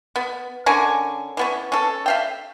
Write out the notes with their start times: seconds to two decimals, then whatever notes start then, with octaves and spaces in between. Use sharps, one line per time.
0.16 B3
0.66 D3 C#4 A#4 G#5
1.37 E3 B3 C#4
1.72 C#4 A4
2.06 E5 F5 G5